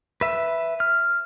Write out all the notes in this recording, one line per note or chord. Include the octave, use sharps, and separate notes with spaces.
B4 E5
F6